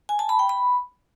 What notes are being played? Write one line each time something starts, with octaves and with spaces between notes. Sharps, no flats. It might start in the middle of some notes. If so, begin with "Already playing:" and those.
G#5
A5
B5
G5
B5